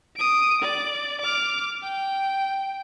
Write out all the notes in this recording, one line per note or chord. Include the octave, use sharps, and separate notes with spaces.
D#6 D7
D5
D6 F6
G5